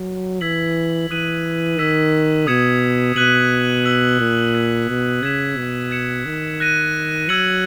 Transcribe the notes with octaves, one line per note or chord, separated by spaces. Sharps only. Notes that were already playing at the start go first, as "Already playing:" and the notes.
Already playing: F#3
E3 E6 G#6 B6 F#7
E3 D#6 F#6 B6 D#7 F#7
D#3 E6 G#6 B6 E7
B2 D#6 G#6 C#7 E7
B2 F#6 B6 D#7 F#7
E6 G#6 B6 D#7 F#7
A#2
E6 G#6 B6
B2
C#3 G#6 B6 E7
B2
G#6 C#7 E7
D#3
F#6 A#6 D#7
F#3 E6 G#6 C#7 F#7